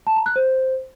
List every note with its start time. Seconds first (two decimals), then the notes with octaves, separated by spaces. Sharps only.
0.07 A5
0.16 A#5
0.26 F#6
0.36 C5